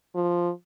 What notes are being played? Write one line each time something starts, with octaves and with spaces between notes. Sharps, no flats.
F3